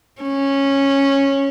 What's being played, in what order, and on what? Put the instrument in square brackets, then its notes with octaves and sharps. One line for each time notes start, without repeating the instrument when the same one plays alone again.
[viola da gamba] C#4